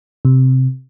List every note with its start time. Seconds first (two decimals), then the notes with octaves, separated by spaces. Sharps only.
0.25 C3